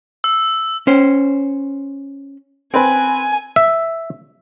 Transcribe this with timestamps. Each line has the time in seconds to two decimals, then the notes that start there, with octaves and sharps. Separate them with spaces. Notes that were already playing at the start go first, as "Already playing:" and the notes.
0.24 E6
0.87 C#4 C5
2.74 C4 B4 G#5
3.56 E5